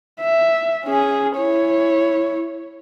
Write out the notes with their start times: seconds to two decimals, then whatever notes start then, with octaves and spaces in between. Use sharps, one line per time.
0.21 E5
0.85 C#4 G#4
1.36 E4 C#5